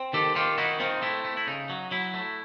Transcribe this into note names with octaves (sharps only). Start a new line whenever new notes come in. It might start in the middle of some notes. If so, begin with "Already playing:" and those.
Already playing: C4
D#3 G4 A4
D#3 F4 G4
D#4 E4 F#4
C4 D#4 F4
A3 E4
A3
E4
C#3 D#4
F#3
F#3 E4
A3